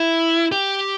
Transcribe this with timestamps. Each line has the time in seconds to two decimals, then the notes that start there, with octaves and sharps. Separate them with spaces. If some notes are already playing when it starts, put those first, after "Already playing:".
Already playing: E4
0.52 G4